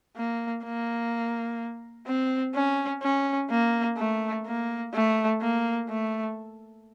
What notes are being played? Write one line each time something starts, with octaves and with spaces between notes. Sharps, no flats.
A#3
A#3
C4
C#4
C#4
A#3
A3
A#3
A3
A#3
A3